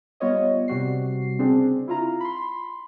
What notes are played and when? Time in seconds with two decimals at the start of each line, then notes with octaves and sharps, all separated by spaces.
0.20 G3 B3 F4 C#5 D#5
0.68 C3 G3 F#4 C7
1.39 C#3 C4 D4 G#4
1.88 E4 F4 A#5
2.20 B5 C6